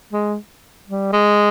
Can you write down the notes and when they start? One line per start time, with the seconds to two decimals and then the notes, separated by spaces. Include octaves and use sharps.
0.13 G#3
0.88 G3
1.13 G#3